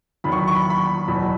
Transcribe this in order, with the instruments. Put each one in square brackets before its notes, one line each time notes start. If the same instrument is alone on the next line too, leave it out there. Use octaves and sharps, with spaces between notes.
[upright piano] E2 D#3 F#3 B5
C#6
B5
C#6
B5
C#6
B5
F#1 E2 B2 F#3 B5